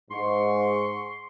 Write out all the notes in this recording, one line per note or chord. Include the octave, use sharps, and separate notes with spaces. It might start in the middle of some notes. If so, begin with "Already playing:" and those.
G#2 C6 C#6